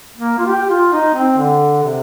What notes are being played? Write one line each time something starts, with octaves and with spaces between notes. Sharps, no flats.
A#3
F4
G4
F4
D#4
C4
D3
C3